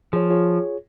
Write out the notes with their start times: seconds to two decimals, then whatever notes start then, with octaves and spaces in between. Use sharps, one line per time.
0.13 F3 G#4 C#5
0.30 F4 G#4 C#5